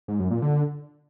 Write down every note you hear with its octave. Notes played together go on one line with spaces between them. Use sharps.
G#2
F#2
A#2
D3